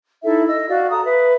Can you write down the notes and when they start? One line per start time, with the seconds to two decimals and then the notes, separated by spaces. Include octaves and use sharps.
0.24 D#4 E4 A4 E5
0.48 D#5 E6
0.69 F#4 D5 F5
0.91 A4 A#5 D#6
1.05 B4 E5